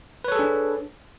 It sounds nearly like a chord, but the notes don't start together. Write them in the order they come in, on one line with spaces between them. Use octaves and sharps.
B4 C#5 A4 G#4 D4